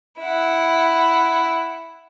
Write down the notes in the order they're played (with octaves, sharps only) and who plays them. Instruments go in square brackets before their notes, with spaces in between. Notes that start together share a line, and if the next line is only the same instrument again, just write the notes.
[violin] E4 F#5